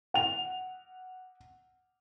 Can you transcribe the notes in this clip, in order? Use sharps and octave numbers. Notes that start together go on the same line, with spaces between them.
F#5 F7